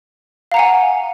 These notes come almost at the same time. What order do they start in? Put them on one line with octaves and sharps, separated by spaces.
F5 A#5 F#5 G#5